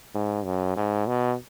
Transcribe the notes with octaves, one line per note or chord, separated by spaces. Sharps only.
G#2
F#2
G#2
B2